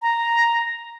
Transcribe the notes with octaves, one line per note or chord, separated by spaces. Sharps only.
A#5